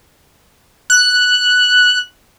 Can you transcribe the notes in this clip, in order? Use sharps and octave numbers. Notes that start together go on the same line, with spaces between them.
F#6